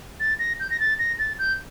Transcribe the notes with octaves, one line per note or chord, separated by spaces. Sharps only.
A6
A#6
G6
A#6
A6
A#6
A6
G6